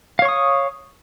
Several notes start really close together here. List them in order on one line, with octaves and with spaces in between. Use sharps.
F5 C#5 C#6 D#6